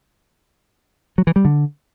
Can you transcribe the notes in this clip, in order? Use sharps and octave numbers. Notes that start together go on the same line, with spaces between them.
F#3
E3
G3
D3